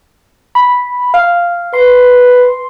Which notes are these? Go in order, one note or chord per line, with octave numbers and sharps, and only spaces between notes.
B5
F5
B4 C6